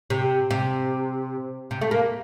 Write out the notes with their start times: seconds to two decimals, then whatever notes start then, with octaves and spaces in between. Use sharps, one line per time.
0.10 C3
0.51 C3
1.71 C3
1.81 A3
1.91 A#3